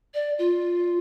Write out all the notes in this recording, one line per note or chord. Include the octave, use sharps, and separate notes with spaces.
D5
F4